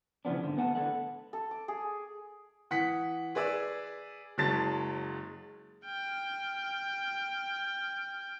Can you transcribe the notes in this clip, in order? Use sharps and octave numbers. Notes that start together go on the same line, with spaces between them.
C#3 E3 F3 B3 D4
G#2 D3
B3 B4 F#5 G#5 A5
A2 D3 A4 B4 F#5
A4
D6
G#4
E3 F#5 D#6 B6
G#4 B4 D5 E6
F#1 F#3 G#3 A5 A6
G5 F6